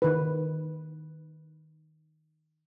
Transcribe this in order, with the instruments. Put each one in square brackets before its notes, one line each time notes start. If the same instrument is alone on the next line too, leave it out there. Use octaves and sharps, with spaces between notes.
[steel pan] D#3 B4